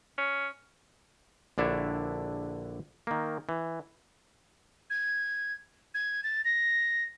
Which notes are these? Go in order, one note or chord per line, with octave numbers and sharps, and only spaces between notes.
C#4
A#1 D3 D4 E4 C#5 E5
D#3 A#3
E3
G#6
G#6
A6
A#6